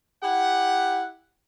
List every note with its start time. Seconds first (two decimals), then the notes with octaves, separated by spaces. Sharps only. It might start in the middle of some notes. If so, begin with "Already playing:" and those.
0.23 E4 G4 F#5